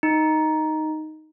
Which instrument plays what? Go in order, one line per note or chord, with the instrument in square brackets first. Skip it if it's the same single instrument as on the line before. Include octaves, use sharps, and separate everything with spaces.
[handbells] D#4